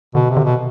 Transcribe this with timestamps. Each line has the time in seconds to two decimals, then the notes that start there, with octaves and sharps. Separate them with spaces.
0.15 B2 D3
0.30 C3
0.37 D3
0.44 B2